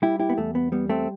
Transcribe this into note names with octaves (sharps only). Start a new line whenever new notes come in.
G3 E4 G4
E4 G4
B3
E2 A3
B3
G3 B3
A3 C4